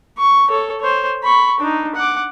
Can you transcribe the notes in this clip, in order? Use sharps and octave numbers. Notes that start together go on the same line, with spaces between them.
C#6
A4 C#5
C5 C#5
B5 C#6
D4 D#4
F#5 D6